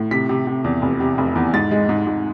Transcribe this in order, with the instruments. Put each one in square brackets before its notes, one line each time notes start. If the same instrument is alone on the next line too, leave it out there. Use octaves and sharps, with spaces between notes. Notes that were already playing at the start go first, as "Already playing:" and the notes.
Already playing: [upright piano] A2
C3 B6
C3
C3
E2
F1
C3
F1
E2
G#2 A6
G#3
G#2
G#2